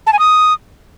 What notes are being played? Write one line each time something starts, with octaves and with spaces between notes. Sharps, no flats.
A5
G#5
D#6